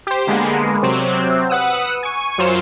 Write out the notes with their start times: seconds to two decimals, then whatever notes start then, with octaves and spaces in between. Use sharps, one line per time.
0.07 G4 C5
0.27 D3 G#3 A#3 B3
0.83 C3 F#3 C4
1.49 B4 F#5 D#6 E6
2.03 G#5 C#6
2.38 F#2 F#3 F4 C5 E7